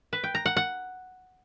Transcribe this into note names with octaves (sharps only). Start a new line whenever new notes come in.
B4
G5
A#5
F#5
F#5